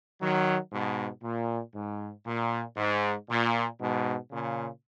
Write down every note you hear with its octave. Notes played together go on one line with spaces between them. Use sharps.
D#3 F#3
G#2 B2
A#2
G#2
A#2
G#2
A#2
G#2 B2
A#2 C#3